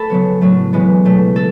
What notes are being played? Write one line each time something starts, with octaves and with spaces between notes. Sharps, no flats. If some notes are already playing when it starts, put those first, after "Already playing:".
Already playing: A3 A4 A5 B5
C#3 F#3 B3
A2 F#3 A3
C#3 E3 G#3 B3
B2 F#3 A3
A4